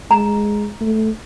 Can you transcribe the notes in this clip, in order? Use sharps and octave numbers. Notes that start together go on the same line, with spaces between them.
G#3 A#5
A3